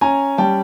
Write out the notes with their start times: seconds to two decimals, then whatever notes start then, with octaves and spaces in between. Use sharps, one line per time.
0.01 C#4 G#5 A#5
0.38 G3 G5 A5